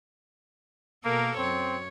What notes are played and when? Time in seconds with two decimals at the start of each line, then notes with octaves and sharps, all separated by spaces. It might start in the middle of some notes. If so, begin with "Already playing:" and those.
1.05 B2 A#3 A4 A#4
1.37 F#2 C4 C#5